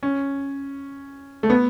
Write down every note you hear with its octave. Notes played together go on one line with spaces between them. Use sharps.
C#4
A3
B3